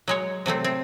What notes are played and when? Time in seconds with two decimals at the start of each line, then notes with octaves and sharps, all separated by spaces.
0.08 F#3 G#3 C#5
0.46 C3 F#3 A3 C4
0.64 C4